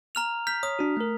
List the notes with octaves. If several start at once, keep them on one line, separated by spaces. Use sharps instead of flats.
A#5 F6 F7
F6 G6 B6
C#5 D#6
D4 F#4
A3 A#4